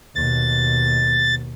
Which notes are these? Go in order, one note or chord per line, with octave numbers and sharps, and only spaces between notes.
D#2 B2 A6